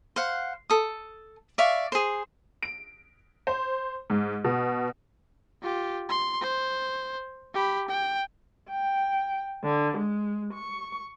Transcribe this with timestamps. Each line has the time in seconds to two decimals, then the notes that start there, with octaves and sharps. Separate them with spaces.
0.16 C5 F5 F#5
0.70 A4 D#6
1.58 D5 E5 F5 C#6
1.92 G#4 C5
2.63 D7
3.47 C5
4.10 G#2
4.44 B2
5.62 F4 G4
6.09 C6
6.41 C5
7.54 G4 B5
7.88 G5
8.70 G5
9.64 D3
9.98 G#3
10.53 C#6